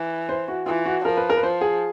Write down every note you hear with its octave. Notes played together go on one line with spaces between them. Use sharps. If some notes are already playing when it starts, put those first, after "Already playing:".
Already playing: E3
C5
F#4
E3 F4
F#4
F3 A#4
B4
A#4
B4
F3 C5
G#4